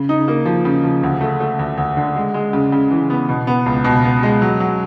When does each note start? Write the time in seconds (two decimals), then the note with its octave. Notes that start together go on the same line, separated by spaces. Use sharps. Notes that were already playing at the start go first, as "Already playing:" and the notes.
Already playing: C#3
0.09 D#4
0.28 A#3
0.46 F3
0.65 C#3
0.84 F3
1.03 D2
1.21 A3
1.40 A3
1.59 D2
1.77 D2
1.96 D3
2.16 G#3
2.34 G#3
2.53 C#3
2.72 C#3
2.91 E3
3.10 B3
3.29 B2
3.47 B3
3.66 C#2
3.84 B2
4.04 B3
4.23 G#3
4.42 F#3
4.60 F#3